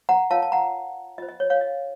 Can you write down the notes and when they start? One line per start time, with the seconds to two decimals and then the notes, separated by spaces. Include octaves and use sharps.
0.09 F#5 A#5
0.31 F4 A#4 C#5 F5 A5
0.42 A5
0.52 F#5 A#5
1.18 F4 D#5
1.22 C5
1.29 D#5
1.40 C#5
1.50 C#5 F5
1.61 D#5